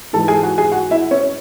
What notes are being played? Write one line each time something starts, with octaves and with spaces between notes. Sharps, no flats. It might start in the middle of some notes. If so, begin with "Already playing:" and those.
G#2 E3 G#3 A4 A5
G#4 G#5
F#4 F#5
G#4 G#5
F#4 F#5
E4 E5
C#4 C#5